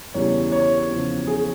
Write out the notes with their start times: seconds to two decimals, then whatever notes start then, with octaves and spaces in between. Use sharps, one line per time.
0.14 E2 C#3 E3 G3 C#5
0.52 C#5
0.89 E2 C#3 F3
1.27 G#4